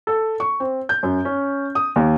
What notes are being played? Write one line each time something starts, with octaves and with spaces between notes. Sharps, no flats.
A4
C#6
C4
G6
F#2
C#4
D#6
D#2